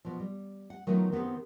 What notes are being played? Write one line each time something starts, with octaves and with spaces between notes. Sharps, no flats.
B2 F3
G3
F#5
D#3 F#3 A3 B3 D#4 F4
D#3 B3 C4 G4 G#4